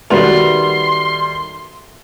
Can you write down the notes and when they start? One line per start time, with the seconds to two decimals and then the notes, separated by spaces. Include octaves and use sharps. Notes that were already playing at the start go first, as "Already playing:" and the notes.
0.10 D#3 G3 A3 F#4 B4 C6 F7